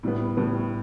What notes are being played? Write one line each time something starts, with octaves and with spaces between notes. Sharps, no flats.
A2 G3 B3
A2 G3 B3